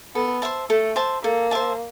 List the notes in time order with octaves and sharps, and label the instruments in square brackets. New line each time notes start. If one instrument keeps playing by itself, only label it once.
[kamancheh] B3 [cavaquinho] A4
[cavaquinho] C5 E5 A5
[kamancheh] A3 [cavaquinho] A4
[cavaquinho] C5 E5 A5
[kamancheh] A#3 [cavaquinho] A4
[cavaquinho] C5 E5 A5